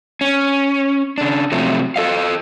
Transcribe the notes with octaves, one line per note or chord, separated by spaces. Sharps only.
C#4
C#3 D4
C3 F3 F#3 A3
F4 A4 D#5 F5